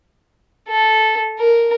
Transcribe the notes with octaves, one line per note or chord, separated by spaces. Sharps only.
A4
A#4